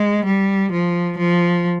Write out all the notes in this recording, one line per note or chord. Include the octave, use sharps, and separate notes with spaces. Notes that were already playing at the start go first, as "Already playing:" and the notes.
Already playing: G#3
G3
F3
F3